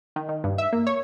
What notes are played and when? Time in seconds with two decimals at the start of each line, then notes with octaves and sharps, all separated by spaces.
0.16 D#3
0.29 D#3
0.44 G2
0.58 E5
0.72 A#3
0.87 C#5